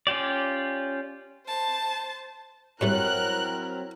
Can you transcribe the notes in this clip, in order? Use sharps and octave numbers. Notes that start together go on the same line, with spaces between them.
C#4 F4 G4 D5
C5 A5
A2 F#3 G3 A3 C4 E4 A#4 F#6